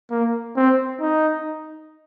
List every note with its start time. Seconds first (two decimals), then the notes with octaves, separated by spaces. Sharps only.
0.10 A#3
0.56 C4
1.00 D#4